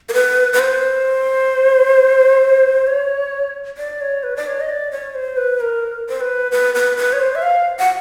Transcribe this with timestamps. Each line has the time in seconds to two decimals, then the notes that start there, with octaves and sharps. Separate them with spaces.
0.09 A#4
0.14 B4
0.53 B4
0.59 C5
2.87 C#5
3.78 D5
4.01 C#5
4.23 B4
4.37 D5
4.47 C#5
4.60 D#5
4.69 D5
4.91 C#5
5.15 C5
5.37 B4
5.61 A#4
6.09 C5
6.21 B4
6.52 B4
6.75 B4
6.97 B4
7.13 C#5
7.19 C5
7.35 E5
7.42 F5
7.79 F#5